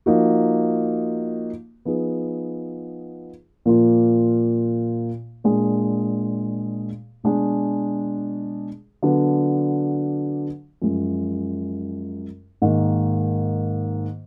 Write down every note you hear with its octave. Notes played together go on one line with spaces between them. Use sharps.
F3 A#3 D#4 F#4
F3 B3 D#4 G#4
A#2 F3 A#3 F4
A#2 G#3 D4 G#4
B2 G#3 D4 G#4
D3 F#3 B3 D4
F#2 F3 G#3
G#2 D#3 A#3